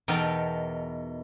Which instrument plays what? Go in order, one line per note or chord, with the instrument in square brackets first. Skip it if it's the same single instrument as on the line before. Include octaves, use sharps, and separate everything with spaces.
[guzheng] E2 B2 D#4 A4 A#4 G5